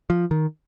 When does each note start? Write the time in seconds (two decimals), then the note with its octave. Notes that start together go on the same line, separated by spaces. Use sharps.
0.10 F3
0.31 D#3